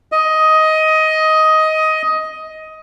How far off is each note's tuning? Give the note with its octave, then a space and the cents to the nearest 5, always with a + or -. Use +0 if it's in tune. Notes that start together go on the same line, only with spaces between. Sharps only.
D#5 +15